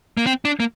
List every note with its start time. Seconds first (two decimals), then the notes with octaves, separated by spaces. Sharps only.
0.17 A#3
0.26 C4
0.45 D4
0.60 A#3